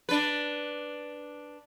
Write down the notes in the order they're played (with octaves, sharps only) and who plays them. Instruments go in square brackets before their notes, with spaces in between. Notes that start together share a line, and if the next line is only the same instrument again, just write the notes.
[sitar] D4 B4